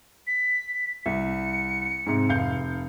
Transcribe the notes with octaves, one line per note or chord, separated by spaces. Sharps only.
B6
C2 C#7
G#2 C3
F1 F5 G6